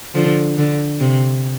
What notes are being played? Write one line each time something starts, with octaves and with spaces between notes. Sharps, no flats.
D3 F3
D3
C3